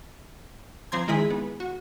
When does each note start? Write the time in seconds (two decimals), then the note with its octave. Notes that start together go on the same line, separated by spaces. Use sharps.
0.92 F3 C4 A#5 C6 G#6
1.08 D#3 G#3 E4 G#4 B6
1.30 B3
1.60 F#4